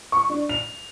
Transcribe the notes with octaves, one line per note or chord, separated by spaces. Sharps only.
C#6
D4
F7